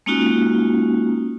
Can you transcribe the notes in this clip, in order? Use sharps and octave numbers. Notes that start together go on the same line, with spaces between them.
G#3 A#3 C#4 D#4 F4 F#4